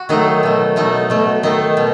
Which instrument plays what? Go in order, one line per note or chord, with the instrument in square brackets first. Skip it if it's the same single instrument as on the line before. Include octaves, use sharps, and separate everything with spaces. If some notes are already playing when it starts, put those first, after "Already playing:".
Already playing: [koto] F#4
D#3 F#3 A3 D#4
B2 A3
B2 A3 D#4
B2 A3
D#3 A3 D#4
B2